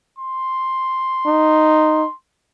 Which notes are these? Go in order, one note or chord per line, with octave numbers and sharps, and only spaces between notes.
C6
D#4